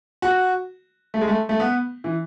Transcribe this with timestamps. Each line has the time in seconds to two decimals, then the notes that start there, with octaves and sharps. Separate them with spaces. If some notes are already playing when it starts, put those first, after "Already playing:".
0.22 F#4
1.14 A3
1.21 G#3
1.28 A3
1.49 A3
1.60 B3
2.04 E3